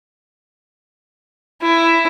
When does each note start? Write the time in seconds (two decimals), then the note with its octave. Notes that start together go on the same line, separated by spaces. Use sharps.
1.62 E4